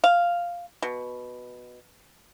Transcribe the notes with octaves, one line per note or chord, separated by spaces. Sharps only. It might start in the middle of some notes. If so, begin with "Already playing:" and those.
F5
B2